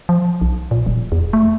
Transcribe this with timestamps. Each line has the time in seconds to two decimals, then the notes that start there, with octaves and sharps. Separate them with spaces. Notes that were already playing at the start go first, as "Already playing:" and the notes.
0.09 F3
0.41 B1
0.71 A#2
0.86 D#1
1.12 E2
1.33 A3